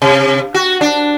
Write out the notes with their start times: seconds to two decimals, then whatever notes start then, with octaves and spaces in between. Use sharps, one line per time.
0.02 C3
0.54 F#4
0.81 D4